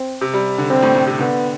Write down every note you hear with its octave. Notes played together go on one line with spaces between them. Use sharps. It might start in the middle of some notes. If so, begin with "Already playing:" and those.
Already playing: C4
C3
G3
D3
C3 C4
A2
A2
C3
D3 B3